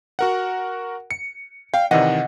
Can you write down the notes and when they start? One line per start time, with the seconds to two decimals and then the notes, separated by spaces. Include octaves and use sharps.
0.19 F#4 A#4 F#5
1.11 C#7
1.74 F5 G5
1.91 C3 D#3 E3 D#5 F#5